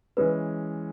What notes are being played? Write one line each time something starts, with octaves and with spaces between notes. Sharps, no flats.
E3 G#3 C#4 B4